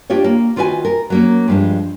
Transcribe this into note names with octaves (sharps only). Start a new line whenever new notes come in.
D4 F4 G4 C#5
A#3
D#3 F4 F#4 B4 E5 G#5
A#4
F#3 A#3 C#4
G2 F3 G#3